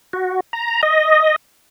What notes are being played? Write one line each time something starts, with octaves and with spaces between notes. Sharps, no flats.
F#4
A#5
D#5